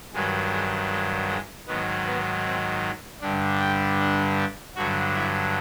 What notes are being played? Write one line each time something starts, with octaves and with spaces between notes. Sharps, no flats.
G2 D#3 F#3 G#3
G#3
G#3
G#3
G#2 D#3 F#3 B3
B3
C4
G2 D3 G3 D4
G4
D4
G2 D3 F#3 F#4
E4